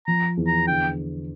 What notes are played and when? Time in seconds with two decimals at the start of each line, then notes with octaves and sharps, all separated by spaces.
0.07 F3 A#5
0.37 E2
0.47 A#5
0.67 D3 G5